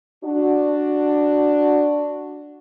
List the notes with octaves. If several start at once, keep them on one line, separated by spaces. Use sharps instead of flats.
D4 F#4